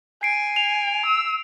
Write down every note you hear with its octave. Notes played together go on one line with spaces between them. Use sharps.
G#5 C7 D7
F7
E6